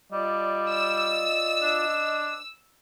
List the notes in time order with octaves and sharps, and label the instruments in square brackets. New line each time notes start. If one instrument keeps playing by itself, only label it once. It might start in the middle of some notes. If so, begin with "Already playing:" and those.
[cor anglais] G3 [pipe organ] F4 D5 [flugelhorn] D#5
[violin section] E6
[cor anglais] D4